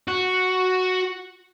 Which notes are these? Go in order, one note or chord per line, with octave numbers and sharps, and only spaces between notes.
F#4